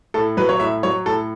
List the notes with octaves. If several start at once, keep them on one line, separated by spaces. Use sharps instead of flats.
A2 A4
F#3 B4
C#5
A2 E5
F#3 C#5
A2 A4